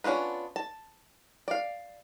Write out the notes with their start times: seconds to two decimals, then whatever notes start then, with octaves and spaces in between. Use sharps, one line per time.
0.04 B3 C#4 D4 F4 B4
0.56 A5
1.48 D5 F5